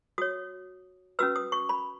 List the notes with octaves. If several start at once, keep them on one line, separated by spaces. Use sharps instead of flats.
F#4 C#5 D#6
C#4 F#4 B4 E6
D#6
C#6
B5